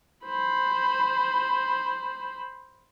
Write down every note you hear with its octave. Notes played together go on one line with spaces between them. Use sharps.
C5 B5